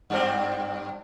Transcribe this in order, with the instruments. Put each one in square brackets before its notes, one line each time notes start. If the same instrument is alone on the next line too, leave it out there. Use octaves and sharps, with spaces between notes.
[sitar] G2 G3 C4